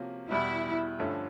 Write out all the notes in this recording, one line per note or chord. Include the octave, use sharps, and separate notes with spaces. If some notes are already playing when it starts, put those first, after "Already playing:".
Already playing: C3 F3 A#3 C#4 F#4
E2 B2 G3 E4
G2 D3 F3 A3 C#4